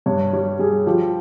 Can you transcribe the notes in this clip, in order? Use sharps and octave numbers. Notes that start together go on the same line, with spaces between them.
G2 C#5
G3 C#5
G3 G#4
F3 G4